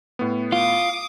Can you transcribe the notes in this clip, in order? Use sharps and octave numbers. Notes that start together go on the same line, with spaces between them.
A2 B3
F4 F5 D6 D#6